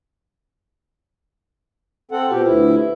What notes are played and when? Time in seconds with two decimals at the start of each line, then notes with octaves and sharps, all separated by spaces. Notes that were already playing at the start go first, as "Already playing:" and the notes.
2.11 C4 A4 F#5
2.31 B2 F4 G4 C5
2.46 D2 E4 G4 B4 E5